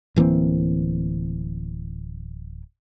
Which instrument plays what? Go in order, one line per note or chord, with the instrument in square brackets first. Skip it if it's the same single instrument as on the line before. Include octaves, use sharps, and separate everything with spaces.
[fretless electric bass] D1 E3 A#3 C4